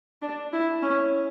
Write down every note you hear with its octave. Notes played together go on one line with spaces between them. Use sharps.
D4
E4
C#4